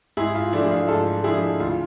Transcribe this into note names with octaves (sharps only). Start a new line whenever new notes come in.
G#2 E4 G#4
F4
F3 A3 D4 E4
G#4
F4
G#2 F4 A4
F3 A3 D4 E4 G#4
D2 F4